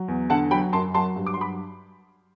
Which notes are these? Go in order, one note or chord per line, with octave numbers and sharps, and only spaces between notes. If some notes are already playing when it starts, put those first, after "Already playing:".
Already playing: F#3
E2
D3 F#5 A5
F#3 G5 B5
F#2 A5 C6
F#3 A5 C6
G2
D6
C6
F#3 B5 D6